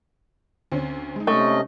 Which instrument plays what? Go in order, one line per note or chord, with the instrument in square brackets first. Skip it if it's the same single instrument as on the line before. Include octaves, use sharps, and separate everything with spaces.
[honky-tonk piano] D2 C4 C#4
G#3 D#4
[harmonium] C3 C#4 D#5 [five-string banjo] A3